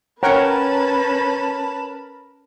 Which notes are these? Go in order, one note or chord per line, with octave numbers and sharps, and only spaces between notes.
C#4 A#4 B4 C#5 F#5 G5 A5 B5